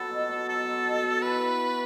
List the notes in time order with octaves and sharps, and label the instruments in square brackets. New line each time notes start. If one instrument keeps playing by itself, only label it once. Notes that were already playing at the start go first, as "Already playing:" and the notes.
Already playing: [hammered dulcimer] F#3 B3 [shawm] A4
[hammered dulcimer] B2
B2
[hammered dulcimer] F#3 [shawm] A4
[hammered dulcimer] B3
B2
B2
[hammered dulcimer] E3 [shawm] B4
[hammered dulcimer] B3
F#4